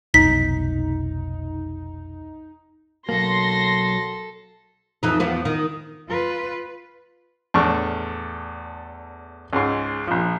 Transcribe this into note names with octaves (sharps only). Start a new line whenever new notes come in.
F1 B1 D#4 B6
B1 F#3 A#3 A4 C6 A#6
F2 E3 D#4
E2 F3 B3
D#3
F4 B4
E2 A2 D4 C#6 F6
C#2 G#2
A#1 F3